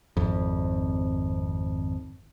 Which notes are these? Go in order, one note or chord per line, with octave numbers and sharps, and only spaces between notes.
G#1 F2